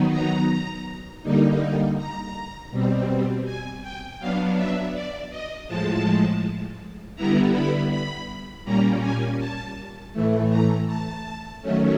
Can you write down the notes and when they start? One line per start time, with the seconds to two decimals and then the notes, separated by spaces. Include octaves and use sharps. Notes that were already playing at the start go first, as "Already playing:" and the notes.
Already playing: D#3 F#3 B3 D#4
0.12 A#5
1.23 D3 G3 A#3 D#4
1.97 A#5
2.71 B2 G3 C4
3.45 G#5
3.82 G5
4.19 F#3 B3 D4 F5
4.57 E5
4.94 D5
5.31 D#5
5.68 A2 F3 G#3 A5
7.16 D3 G3 B3 E4 A#5
7.53 B5
7.91 B5
8.65 A#2 G3 A#3 C#4 A#5
9.01 G#5
9.39 A5
10.13 A2 E3 A3
10.50 A#5
10.87 A5
11.62 D#3 F#3 A3 C#4